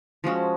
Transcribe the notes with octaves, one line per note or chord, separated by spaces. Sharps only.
F3 G#3 C#4 F#4